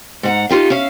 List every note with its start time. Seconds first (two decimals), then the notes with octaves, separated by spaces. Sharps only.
0.23 G#2 F#5 A#5
0.49 D#4 F4 G4 F5
0.70 C#4 E5 F5